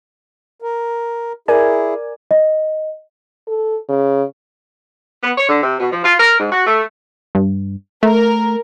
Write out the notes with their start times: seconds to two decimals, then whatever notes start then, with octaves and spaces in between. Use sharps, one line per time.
0.62 A#4
1.48 E4 G#4 A#4 D5 G#5
2.31 D#5
3.48 A4
3.89 C#3
5.24 B3
5.38 C#5
5.49 D3
5.63 C3
5.81 B2
5.93 F3
6.05 F4
6.20 A#4
6.40 G#2
6.52 F#4
6.67 A3
7.35 G2
8.03 A3 A#4